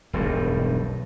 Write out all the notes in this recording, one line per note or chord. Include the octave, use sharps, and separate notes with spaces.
E1 B1 G2